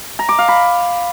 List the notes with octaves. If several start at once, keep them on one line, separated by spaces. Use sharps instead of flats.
A#5
D6
F5
B5